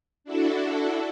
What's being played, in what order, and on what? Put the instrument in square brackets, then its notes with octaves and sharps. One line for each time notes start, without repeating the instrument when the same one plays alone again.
[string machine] D4 E4 F#4 A4